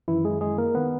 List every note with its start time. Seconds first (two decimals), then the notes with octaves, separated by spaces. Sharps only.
0.08 F#2 D#3 E3 E4
0.25 G#3 G#4
0.41 G#3 G#4
0.58 A#3 A#4
0.75 D#3 B3 B4